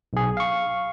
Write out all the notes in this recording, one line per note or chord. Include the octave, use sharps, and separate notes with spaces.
B1 G#4
F5 C#6